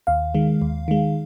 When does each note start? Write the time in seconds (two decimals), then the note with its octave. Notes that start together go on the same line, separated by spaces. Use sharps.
0.07 D#2 F5
0.34 D#3 G#3
0.62 D#2
0.88 D#3 G#3